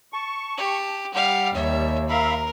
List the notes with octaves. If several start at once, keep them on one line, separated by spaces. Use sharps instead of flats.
A5 C#6
G4
G3 G4 F5 F#5
D#2 C#5 E5
A#4 E5 F5 A#5 B5